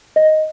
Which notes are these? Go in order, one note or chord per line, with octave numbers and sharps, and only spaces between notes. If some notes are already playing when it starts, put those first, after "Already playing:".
D#5